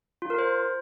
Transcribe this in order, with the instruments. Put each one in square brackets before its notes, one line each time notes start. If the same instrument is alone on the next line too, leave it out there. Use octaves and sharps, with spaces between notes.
[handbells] F4
A#4
C5